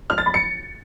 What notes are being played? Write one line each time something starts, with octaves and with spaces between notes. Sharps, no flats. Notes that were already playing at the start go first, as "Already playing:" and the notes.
F6
A6
B5
C#7